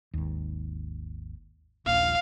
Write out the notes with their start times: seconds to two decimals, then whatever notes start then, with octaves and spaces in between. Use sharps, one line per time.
0.14 G#1 D#2
1.86 D#1 A#1 A#2 F5